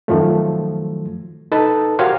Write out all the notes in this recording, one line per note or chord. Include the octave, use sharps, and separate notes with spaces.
F#2 D#3 F3 F#3 A3
D#4 A4 B4 A5
F#4 G4 A#4 C5 C#5 F5